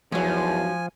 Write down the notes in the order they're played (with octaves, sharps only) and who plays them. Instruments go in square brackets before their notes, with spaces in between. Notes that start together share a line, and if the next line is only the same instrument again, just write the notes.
[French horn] E2 [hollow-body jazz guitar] G#2 F#3 [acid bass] F3 [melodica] G#5